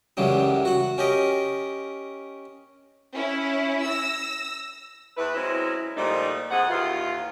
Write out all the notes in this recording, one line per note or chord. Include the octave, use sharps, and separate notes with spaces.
C#2 F#2 C#3 E3 F#3 G3
F#4 F#5
C#4 G4 A#4 D#5
C#4 E4
E6 A#6
E2 E3 E4 B4
F#3 G#3 C4 C#4 E4
A#2 D#3 F3 G3 A3 D#4
F2 A2 C4 G#4 F#5
D#2 A2 E3 F4